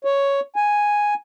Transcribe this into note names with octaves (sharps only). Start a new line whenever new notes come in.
C#5
G#5